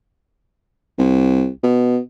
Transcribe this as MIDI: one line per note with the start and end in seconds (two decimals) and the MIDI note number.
0.98 1.49 36
1.63 1.99 47